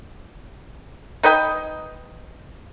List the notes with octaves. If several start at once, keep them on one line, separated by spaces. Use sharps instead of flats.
D#4 B4 D#5 G5